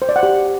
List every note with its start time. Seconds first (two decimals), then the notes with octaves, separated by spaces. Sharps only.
0.02 C5
0.09 D5
0.16 F#5
0.23 G4